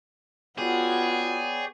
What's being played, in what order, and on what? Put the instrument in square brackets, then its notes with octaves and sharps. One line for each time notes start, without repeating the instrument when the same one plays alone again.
[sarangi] B3 [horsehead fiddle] F4 F#4 [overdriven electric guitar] G#4 [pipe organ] C#5 D5 G5